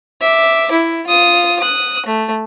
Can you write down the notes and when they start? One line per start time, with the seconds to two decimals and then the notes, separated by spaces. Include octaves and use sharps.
0.21 E5 D6
0.72 E4
1.07 F4 D#6
1.60 D#6 F#6
2.06 A3